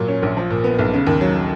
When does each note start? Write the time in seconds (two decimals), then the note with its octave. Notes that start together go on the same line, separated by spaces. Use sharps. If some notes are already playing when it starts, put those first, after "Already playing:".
Already playing: A#2 F#3
0.08 C#4
0.23 A#1
0.37 F3
0.50 A#2
0.64 B3
0.79 B1
0.94 C#3
1.07 D#2
1.21 F#3